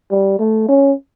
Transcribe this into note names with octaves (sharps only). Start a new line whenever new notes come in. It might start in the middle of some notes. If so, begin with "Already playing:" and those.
G3
A3
C#4